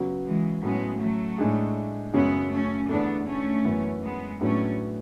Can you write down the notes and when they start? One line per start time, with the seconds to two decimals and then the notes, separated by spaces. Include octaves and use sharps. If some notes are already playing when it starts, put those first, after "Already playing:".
Already playing: C#3 F#3 B3 F#4
0.25 E3 G#3
0.63 A2 F#3 G#3 B3 C#4
1.00 F#3 A3
1.38 A2 G#3 D4 G#4
2.13 F#2 C#3 F#3 G#3 B3 C#4 G#4
2.51 A3 C#4
2.89 E2 D3 A3 B3 D4
3.27 A3 C#4
3.65 F#2 E3 B3
4.02 G#3 B3
4.41 A2 F#3 A3 B3 C#4 D4 G#4